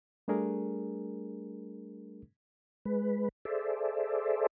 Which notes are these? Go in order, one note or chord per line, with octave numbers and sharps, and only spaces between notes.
G3 A3 D4 G#4 A#4
G#3 B4
G#4 A4 C5 D5 E5